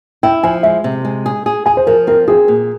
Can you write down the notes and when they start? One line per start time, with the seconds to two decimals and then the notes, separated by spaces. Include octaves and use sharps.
0.23 E4 G5
0.43 F3 G#5
0.63 G#3 E5
0.84 C3
1.05 G#3
1.26 G#4
1.46 G#4
1.66 G#4 G#5
1.77 C5
1.87 F3 A#4
2.07 C4 A#4
2.28 C4 G#4
2.48 A#2